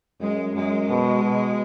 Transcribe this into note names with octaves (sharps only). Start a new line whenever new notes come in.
F#2 G#3
F#2 G#3
B2
B2